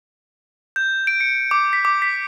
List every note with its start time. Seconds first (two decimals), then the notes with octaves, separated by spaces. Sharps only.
0.76 G6
1.07 D7
1.20 C#7
1.51 D6
1.73 B6
1.85 D6
2.02 B6